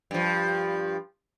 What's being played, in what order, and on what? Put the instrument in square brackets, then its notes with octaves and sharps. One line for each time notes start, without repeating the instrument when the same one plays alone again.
[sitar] G2 F3